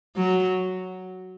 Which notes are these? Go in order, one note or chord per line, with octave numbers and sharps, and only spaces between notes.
F#3